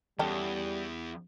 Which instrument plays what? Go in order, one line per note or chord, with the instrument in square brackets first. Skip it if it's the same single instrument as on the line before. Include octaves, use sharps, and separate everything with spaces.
[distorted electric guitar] E2 [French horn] G3 [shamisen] C#4 A4 G5